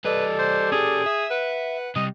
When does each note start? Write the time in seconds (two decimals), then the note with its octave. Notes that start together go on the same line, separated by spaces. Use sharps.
0.05 G3 A4 B4 D5 D#5
0.39 C5
0.72 C#4 G4 G#4
1.06 E5 D#6
1.31 B4 F#5
1.96 C3 G3 D#5